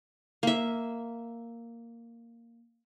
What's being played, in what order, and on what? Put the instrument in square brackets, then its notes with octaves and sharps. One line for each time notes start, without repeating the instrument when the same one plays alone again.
[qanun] A#3 E5